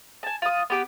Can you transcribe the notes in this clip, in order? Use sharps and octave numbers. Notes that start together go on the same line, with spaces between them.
G#5 A5
F4 D#6
B3 G4 D6